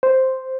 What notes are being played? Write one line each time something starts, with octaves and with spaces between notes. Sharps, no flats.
C5